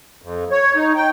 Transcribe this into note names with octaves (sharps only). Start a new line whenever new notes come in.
F2
C#5
D#4
G5